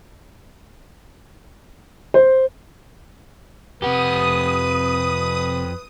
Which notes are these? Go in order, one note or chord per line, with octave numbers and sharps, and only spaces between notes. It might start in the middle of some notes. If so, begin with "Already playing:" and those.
C5
F2 C3 G4 B4 F#5 D#6